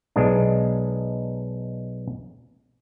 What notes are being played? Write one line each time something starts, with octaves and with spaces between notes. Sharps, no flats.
B1 G#3 D4